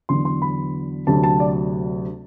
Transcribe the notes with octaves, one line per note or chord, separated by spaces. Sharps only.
E2 D3 F#3 B3 C6
C6
B5
D2 C3 F#3 A5
A5
D5